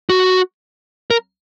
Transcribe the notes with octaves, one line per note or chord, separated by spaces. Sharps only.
F#4
A#4